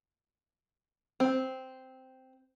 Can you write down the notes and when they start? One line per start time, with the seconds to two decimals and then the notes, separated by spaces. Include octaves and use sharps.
1.20 C4